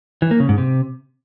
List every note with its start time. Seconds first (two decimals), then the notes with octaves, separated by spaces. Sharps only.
0.22 E3
0.31 A#3
0.40 C#3
0.49 G#2
0.58 C3